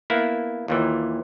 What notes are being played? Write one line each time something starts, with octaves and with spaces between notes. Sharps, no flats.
A#3 B3 E4
D#2 A#2 E3